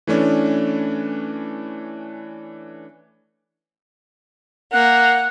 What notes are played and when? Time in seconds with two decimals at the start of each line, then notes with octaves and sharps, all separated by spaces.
0.07 E3 A3 C#4 D4
4.73 A#3 F#5 F#6